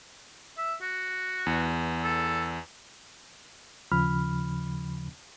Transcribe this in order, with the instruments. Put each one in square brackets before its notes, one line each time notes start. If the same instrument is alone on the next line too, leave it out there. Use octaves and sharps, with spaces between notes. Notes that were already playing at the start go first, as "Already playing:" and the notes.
[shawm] E5
F#4
[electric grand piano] E2
[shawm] A4
[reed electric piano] D#2 C#3 F3 B5 F6